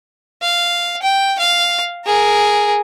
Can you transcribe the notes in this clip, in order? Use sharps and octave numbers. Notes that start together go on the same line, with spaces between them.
F5
G5
F5
G#4 A#4